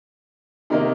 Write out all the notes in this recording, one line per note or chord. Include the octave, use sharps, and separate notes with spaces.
C3 D#3 A#3 D#4